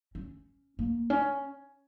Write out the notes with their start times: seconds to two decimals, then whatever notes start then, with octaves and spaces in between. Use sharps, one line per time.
0.15 C#4
0.79 A#3
1.10 C#4